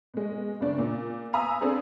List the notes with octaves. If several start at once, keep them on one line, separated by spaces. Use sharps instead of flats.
B2 G#3
F#1 C#4 D4
A#2
F5 G#5 A#5 B5 D#6 E6
C4 D4 G#4 A4 C5